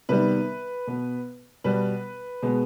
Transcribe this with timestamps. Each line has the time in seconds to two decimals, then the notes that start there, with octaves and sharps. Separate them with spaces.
0.09 C3 D#3 G3 B3 B4
0.87 B2 B3
1.64 B2 G3 B3 B4
2.43 B2 G#3 B3